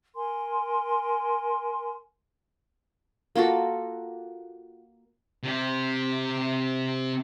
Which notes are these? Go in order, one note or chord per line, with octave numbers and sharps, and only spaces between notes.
A#4 G#5 C6
A#3 F4 F#4 A4
C3 G4